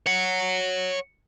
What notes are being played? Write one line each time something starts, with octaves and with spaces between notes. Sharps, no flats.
C#5 F#5